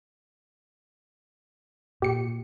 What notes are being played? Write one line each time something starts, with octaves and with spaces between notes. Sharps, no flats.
A#2 G4 C#7